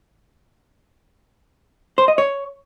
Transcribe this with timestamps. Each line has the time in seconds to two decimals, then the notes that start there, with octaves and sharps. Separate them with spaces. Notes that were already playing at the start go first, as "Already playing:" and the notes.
1.98 C5
2.08 D#5
2.18 C#5